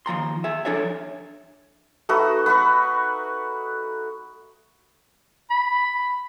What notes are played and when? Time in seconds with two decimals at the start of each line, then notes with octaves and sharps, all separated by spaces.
0.06 D#2 F3 A#5 C6
0.44 G#4 E5
0.65 F3 D4 G#4 A4 C#5 E5
2.09 A3 D#4 F#4 B4
2.46 B4 F#5 B5 C#6
5.50 B5